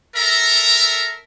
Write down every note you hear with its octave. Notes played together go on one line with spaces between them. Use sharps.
A4 A#4 E5 A#5